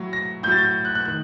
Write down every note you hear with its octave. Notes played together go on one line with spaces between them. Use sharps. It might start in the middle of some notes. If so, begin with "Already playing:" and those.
Already playing: A2 F#3
A#6
A2 F#3 G6 A6
G6
F#6
F#6
D#3 F#6